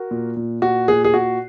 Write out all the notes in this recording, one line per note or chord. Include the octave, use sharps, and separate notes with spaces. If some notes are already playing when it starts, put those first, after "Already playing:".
Already playing: F#4 A#4
A#2
A#2
A#2 F#4
A#2 G#4
G#4
A#2 F#4